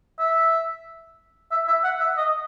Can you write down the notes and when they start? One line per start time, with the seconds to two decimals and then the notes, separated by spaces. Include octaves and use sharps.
0.19 E5
1.51 E5
1.67 E5
1.84 F#5
2.00 E5
2.17 D#5